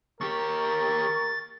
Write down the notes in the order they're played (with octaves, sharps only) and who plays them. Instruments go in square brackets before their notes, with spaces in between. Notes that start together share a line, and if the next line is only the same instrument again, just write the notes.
[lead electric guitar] D#2 G4 [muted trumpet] A#4 [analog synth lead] C#6 [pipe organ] A6